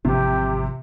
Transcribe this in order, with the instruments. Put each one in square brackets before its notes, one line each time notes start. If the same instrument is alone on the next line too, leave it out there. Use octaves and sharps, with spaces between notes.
[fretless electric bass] G#1 E3 F3 [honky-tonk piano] C3 [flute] G4